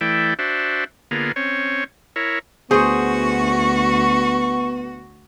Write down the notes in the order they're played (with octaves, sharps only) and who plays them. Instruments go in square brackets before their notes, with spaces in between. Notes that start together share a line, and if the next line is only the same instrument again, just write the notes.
[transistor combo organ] E3 A3 E4 D5 G5
D4 F#4 C5 E5
D3 A#3 B3 F4 G#4
C4 C#4 C#5
E4 A#4 C#5
[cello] D2 F#4 [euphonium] B3 [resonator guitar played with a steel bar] G#4 C5 [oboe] C#6